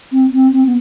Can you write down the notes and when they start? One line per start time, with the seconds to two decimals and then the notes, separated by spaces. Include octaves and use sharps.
0.12 C4
0.33 C4
0.53 C4
0.66 B3